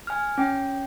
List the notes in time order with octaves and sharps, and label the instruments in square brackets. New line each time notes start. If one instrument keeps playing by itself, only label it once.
[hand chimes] G#5 F6
C#4 G5